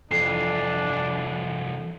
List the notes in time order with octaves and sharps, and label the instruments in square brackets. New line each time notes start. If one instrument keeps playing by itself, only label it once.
[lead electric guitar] C2 E3 [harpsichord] F2 [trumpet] D4 [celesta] C7